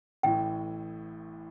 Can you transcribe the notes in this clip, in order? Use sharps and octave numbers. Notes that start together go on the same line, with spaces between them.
A1 A2 E3 G5